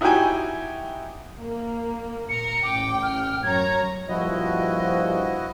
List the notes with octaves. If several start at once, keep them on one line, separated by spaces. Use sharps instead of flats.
D#4 E4 F#4 G4 G5 G#5
A#3
A#2 A#4 C#7
A1 G5 D6
F6
F#2 C#5 A#5 G#6
G2 A#2 F3 E4 F#4 D#5